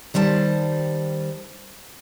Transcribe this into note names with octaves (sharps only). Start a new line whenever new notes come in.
D#3 G3 C5 A5